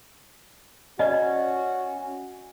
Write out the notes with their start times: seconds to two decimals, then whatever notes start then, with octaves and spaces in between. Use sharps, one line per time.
0.99 C#4 F#4 D5 D#5